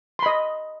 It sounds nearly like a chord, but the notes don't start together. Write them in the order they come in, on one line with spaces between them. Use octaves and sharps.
C6 B5 D#5